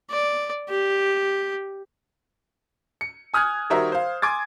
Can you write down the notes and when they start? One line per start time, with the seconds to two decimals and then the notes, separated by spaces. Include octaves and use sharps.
0.10 D5
0.69 G4
3.01 C#7
3.34 G#5 D#6 F6 F#6 G#6
3.70 D#3 G3 F#4 A#4 C5 E5
3.92 C5 F5
4.22 G#5 C6 D6 G#6 A6